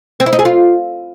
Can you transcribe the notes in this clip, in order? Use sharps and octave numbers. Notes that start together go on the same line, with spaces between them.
C4
E4
D#4
G#4
F4